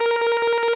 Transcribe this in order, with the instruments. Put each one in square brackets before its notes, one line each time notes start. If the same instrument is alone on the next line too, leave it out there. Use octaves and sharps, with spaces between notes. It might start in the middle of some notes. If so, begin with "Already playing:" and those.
Already playing: [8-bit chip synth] A#4